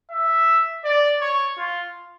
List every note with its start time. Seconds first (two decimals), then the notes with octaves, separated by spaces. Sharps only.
0.10 E5
0.84 D5
1.21 C#5
1.57 F4